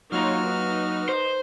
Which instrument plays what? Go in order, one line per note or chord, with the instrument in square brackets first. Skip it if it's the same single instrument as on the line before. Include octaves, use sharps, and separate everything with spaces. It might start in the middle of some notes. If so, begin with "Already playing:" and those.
[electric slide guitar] F#3 A#3 A#5 [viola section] D#4 F4 C#5 [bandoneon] F#4 F6
[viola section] D#4 B4
[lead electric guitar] C5